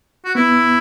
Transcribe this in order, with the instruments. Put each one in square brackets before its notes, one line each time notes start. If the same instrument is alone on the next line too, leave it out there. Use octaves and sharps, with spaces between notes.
[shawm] F#4
[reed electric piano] B3 [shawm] E4